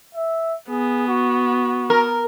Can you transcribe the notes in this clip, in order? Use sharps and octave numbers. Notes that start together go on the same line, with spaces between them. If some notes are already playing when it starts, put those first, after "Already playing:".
E5
B3 G#4
F#4
A#4